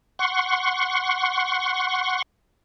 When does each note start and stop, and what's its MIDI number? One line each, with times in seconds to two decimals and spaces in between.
0.19 2.22 78
0.19 2.22 84
0.19 2.22 85